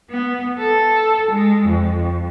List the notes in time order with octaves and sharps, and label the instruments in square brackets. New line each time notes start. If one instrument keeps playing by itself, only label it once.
[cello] B3
A4
G#3
F2